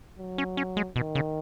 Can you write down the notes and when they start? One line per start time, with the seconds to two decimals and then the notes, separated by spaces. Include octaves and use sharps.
0.19 F#3
0.38 C#4
0.57 C#4
0.77 G#3
0.96 B2 D#3
1.15 C#3